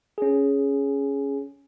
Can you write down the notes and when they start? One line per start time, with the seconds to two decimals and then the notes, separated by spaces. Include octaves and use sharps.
0.18 C#4 G#4